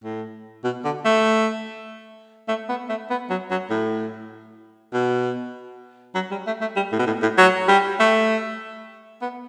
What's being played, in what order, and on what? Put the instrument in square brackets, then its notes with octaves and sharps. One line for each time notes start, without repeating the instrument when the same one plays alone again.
[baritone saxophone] A2
B2
D3
A3
A3
B3
A3
B3
F#3
F#3
A2
B2
F#3
G3
A3
A3
G3
A2
B2
A2
A2
F#3
G3
A3
B3